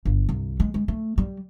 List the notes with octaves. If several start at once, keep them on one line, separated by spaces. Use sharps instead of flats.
G1
C2
G#3
G#3
A3
G3